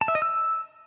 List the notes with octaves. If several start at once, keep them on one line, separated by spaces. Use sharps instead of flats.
A5
E5
D#5
E6